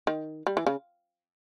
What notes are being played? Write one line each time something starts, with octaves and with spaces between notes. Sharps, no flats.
D#3
G3
E3
C#3